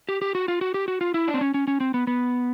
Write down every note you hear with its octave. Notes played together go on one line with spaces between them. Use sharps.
G4
G4
F#4
F4
F#4
G4
F#4
F4
E4
D4
C4
C#4
C#4
C#4
C4
B3
B3